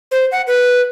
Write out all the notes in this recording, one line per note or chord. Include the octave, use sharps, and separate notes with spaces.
C5
F#5
B4